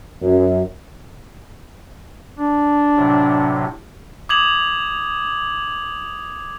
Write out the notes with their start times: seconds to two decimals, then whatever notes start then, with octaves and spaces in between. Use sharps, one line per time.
0.22 F#2
2.39 D4
2.97 A2 C3 F#3
4.29 D6 D#6 G#6 F7 F#7